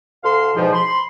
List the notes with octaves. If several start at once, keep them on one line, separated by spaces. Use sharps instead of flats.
D2 A4 F5 C6
E2 G#2 B2 F3
B5 C6